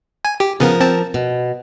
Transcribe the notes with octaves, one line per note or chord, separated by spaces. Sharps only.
G#5
G4
C#3 F3 B3 A#4
C4 A5
B2